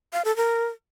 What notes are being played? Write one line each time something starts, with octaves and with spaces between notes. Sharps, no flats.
F5
A4
A#4